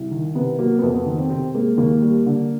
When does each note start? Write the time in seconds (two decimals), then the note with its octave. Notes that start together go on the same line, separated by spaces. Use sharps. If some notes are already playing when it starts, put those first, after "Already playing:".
Already playing: C2
0.11 D#3
0.35 C3 B3
0.59 F#3 A#3
0.79 B3
0.82 F2 A#3
0.94 B3
1.06 D#3 B3
1.18 C4
1.30 C3 C4
1.54 G#3 A#3
1.77 D#2 A#3
2.02 G3
2.26 D3